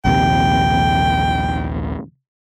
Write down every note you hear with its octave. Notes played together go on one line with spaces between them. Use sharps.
A#1 D#2 C3 G5